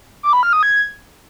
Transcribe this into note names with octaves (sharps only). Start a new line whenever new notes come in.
D6
B5
F6
D#6
G#6